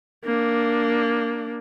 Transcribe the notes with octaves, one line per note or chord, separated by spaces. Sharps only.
A#3 D4